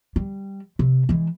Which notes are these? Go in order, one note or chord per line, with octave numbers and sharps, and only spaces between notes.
G3
C3
E3 G#3